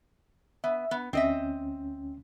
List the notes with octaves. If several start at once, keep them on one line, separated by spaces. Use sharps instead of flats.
B3 E5
B3
D2 C4 C#4 D#5 E5